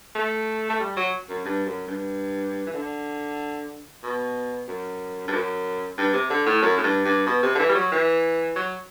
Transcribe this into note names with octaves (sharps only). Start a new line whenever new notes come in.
A3
A3
G3
F#3
F#2
G2
F#2
G2
E3
D3
B2
F#2
G2
F#2
G2
C3
D3
A2
F#2
A2
G2
G2
B2
C3
D3
E3
G3
F#3
E3
F#3